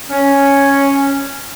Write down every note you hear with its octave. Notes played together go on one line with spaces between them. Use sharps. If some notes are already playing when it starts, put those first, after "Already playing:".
C#4